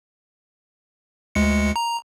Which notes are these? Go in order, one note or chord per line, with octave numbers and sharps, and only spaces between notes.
D2 G#3 C#7
A#5